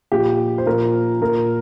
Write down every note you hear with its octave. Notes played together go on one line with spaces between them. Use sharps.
A#2 F3 G4
C5
A#2 F3 A#4
A#2 F3 A#4